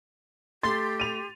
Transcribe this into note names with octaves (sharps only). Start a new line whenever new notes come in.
A3 G4 C6 A6
D#7 F7